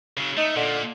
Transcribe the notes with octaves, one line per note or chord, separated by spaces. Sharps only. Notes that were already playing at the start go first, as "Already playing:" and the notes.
C#3 F#3
A3 D#4
A#2 D3